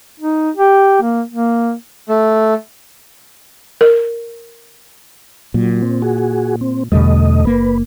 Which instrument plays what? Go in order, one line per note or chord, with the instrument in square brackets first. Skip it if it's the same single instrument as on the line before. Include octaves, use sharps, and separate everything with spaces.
[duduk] D#4
G4
A#3
A#3
[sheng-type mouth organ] A3
[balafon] A#4
[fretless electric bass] A#2 [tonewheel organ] F#3
[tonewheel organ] C4
F#4 G#4
C4
[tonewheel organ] E2 A3 D#5 [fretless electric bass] B2 D3 G3
[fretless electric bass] F#1 A#3 [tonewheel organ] B4